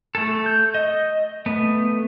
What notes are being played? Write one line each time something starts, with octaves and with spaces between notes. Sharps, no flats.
A3 A4
G6
D#5
A3 B3